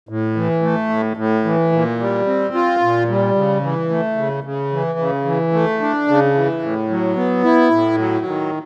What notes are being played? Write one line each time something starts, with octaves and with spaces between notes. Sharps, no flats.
A2
E3
A3
A2
A2
E3
A#2
G3
C4
F4
A#2
G3
C#3
E3
A3
C#3
C#3
E3
C#3
E3
A3
D4
C#3
E3
A2
F#3
B3
E4
A2
F#3
D#3